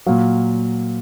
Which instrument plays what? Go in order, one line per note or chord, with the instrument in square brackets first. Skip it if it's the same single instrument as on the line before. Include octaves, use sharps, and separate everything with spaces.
[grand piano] A#2 F#3 F5